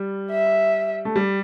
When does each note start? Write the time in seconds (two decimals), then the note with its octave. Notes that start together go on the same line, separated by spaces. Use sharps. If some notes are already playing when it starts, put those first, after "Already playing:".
Already playing: G3
0.31 E5
1.05 A3
1.16 G3